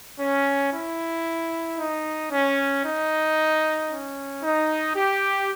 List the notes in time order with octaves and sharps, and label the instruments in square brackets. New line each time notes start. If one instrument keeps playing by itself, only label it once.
[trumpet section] C#4
E4
D#4
C#4
D#4
C#4
D#4
G4